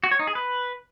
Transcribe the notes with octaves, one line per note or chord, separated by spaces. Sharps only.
F#4
C#5
D#4
G#4
B4